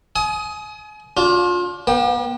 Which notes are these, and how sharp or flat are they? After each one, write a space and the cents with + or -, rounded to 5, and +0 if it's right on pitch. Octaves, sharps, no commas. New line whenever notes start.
G#5 +35 D#6 +15
D4 -30 F4 +30
B3 -45 G5 -5